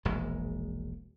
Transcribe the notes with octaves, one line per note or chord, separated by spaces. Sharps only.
E1 A#1 G#3